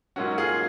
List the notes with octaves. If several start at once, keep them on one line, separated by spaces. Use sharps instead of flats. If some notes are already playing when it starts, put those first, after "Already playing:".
G#2 F#3 A#3 C#4 F#4
F4 G#4